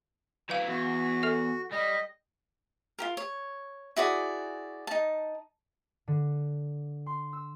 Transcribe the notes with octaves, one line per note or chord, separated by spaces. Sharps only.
F#3 E4 B4 F5
E2 F#4
A4 E5
G3 D#5
F4 G4 A#4
C#5
E4 F#4 G#4 D5
D#4 A5
D3
C6
E6